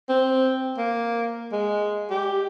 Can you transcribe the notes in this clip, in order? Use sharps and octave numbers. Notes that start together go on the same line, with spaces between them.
C4
A#3
G#3
G4